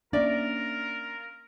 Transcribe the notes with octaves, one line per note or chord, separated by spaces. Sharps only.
A#3 C#4 D4 F4 A#4 D5 E5